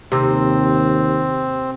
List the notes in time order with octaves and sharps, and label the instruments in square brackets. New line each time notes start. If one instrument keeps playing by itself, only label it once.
[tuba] D#2 [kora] C3 [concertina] C4